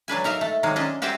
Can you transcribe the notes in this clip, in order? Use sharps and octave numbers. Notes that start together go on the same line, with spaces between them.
F#3 D4 B4 G#5
D#4 A#4 E5 F5
A3
C3 D#3 F#3 G#3 A#3
C#4 D4 D#5
F#4 G4 C5 E5 G5 G#5